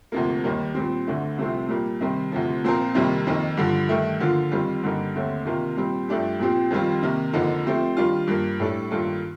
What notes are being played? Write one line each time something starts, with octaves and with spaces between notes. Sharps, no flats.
D2 C3 F3 A#3
D#2 D#3 G3 A#3 D#4
A#2 G3 C4
D2 D3 A3 D4
C2 C3 F3 A3 C4
A#2 G3 A#3
C3 D#3 G3 C4
D2 C3 F3
A#2 F3 C4 F4 A#4
F2 C3 D#3 G3 A#3
F2 D#3 A#3 D#4
G2 D3 F3
G2 D#3 A3
D3 F3 A#3 F4
F2 D#3 G3 C4 F4
G2 D3 G3 A#3 D#4
D#2 D3 A3 C4
C3 D#3 A#3 F4 A#4
A#2 G3 C4
G2 F3 A3 D4 G4
A#2 F3 C4 G4
F2 D#3 G3 C4 F4
C3 D#3 A#3
F2 D3 F3 A#3 D#4
F3 A3 C4 G4
D#3 G3 D4 F4
G2 F3 A#3
A2 G3 D4 A4
G2 D#3 A#3 F4 A4